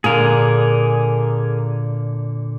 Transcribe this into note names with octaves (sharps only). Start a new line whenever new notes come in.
A#2 D3 G#4 A#4